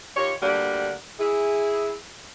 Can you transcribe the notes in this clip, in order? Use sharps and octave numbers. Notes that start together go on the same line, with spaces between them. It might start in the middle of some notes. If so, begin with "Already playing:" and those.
D#3 F4 G4 C#5
D2 G2 D3 G3 A#3 F#5
E4 G#4